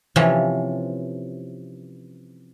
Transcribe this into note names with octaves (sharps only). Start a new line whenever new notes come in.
C3 E3 F3 C#4